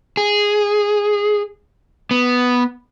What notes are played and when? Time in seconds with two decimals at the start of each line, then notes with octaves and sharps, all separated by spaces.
0.17 G#4
2.11 B3